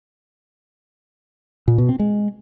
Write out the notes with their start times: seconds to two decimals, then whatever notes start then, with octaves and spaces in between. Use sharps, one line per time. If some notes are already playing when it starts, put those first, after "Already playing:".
1.68 A#2
1.78 B2
1.89 C4
1.99 G#3